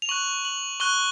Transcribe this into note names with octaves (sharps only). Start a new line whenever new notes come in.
F7
C#6 F#6 F#7
F#7
C#6 F#6 G7